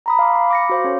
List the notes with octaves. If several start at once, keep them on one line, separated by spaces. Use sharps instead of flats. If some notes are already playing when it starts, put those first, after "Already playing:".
A#5 B5 D#6
F5 D6
B5
D6 A#6 C#7
F#4 C5 F5
C#4 A4 C#5